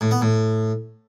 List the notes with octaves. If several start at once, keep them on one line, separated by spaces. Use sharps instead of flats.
A2
B3
A2